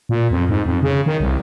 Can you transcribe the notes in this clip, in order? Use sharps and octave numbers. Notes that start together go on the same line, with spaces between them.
A#2
F2
G#2
F2
C#3
D#3
C2